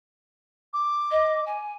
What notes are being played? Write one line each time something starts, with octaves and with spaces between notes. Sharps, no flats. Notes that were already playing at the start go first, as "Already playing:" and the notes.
D6
D#5
G#5